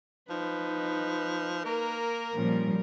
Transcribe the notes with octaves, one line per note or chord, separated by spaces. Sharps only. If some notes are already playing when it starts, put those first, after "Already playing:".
F3 D#4 B4
A#3 A#4
A#2 F3 G3 C#4